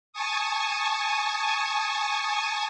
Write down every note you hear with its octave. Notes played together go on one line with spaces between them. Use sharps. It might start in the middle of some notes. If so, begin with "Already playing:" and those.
G#5 A5 C#6 D#6